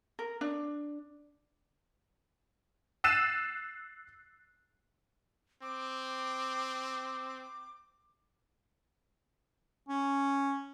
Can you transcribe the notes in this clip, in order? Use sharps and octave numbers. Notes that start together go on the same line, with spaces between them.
A#4
D4
E6 F#6 A6 C7 D#7 E7
C4 D6
C#4